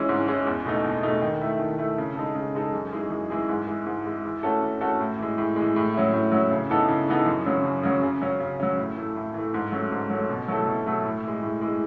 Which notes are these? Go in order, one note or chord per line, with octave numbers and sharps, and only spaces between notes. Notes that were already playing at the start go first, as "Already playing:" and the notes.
Already playing: E3 G#3 C#4
G#2
E3 G#3 C#4
E2
B2 A3 D#4
E2
B2 A3 D#4
D#3
A3 E4
D#3
A3 E4
C#3
G#3 D#4 A4
C#3
G#3 D#4 A4
F#2
E3 G#3 D#4 G#4
F#2
E3 G#3 D#4 G#4
G#2
E3 G#3
G#2
E3 G#3
E3
A3 C#4 F#4 A4
E3
A3 C#4 F#4 A4
A2
E3 G#3
A2
E3 G#3
A2
F#3 C#4 E4
A2
F#3 C#4 E4
C#3
E3 B3 D#4 A4
C#3
E3 B3 D#4 A4
F#2
C#3 F#3 C#4
F#2
C#3 F#3 C#4
C#3
F#3 C#4
C#3
F#3 C#4
A2
E3 A3
A2
E3 A3
G#2
F#3 A3 C#4
G#2
F#3 A3 C#4
B2
F#3 A3 E4 A4
B2
F#3 A3 E4 A4
A2
E3 G#3
A2
E3 G#3